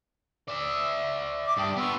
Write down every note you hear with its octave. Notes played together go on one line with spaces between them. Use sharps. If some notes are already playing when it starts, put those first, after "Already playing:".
D5 E5
E5 D6
G2 D5 G5 A5 D#6
B3 F4 C#6 E6